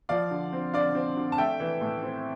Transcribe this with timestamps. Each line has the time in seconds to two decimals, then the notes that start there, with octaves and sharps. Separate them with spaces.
0.09 F3 D5 F5
0.31 D3
0.53 C4
0.74 D3 D5 F5
0.95 C4
1.17 D3
1.32 A5
1.38 A3 E5 G5
1.60 E3
1.81 A2
2.03 C4